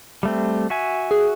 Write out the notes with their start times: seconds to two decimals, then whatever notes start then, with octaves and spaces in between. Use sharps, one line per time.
0.23 G3 A3 C4
0.70 F#4 E5 G#5
1.11 G#4